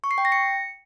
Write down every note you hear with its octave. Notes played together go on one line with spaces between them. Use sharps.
C#6
C7
G5
A#6
C#7